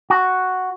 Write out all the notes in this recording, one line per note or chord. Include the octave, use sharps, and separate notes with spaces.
F#4